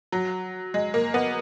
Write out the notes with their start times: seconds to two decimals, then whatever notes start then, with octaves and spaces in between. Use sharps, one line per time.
0.12 F#3
0.74 G#3
0.94 A#3
1.14 B3